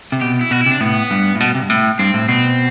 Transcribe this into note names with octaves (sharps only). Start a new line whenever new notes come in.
C3
B2 G4
E4
B2 F#4
E4
C3
D4
A2 B3
G2
A2
B2
C3
G2
A2
G2 C4
A2
B2 C4